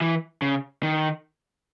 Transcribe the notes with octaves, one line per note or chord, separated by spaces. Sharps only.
E3
C#3
D#3